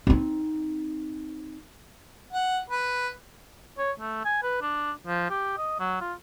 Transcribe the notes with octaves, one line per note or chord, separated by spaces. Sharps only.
C4 D#4
F#5
B4
C#5
A3
G#5
B4
D4
F3
G4
D#5
F#3
F4